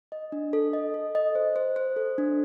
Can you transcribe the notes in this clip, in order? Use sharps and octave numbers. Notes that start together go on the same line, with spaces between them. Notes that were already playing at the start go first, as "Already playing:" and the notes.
D#5
D4
A4
D#5
A4
D#5
C5
C5
C5
A4
D4